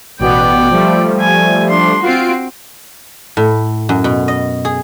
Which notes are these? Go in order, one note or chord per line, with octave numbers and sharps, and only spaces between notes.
A1 B2 B3 D5 G5
F3 G3 A3
G#5
D4 C6
C4 F4 F#4 C7 D7
A2
F#2
B2
D#5
G#4